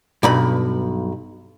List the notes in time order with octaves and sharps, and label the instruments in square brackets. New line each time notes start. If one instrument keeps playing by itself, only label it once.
[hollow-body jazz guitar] B1 G2 B5